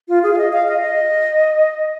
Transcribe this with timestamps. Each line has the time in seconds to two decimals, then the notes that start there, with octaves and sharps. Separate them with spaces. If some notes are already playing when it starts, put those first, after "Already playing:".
0.09 F4
0.23 G#4
0.33 F5
0.38 D#5
0.53 F5
0.68 D#5
0.82 D#5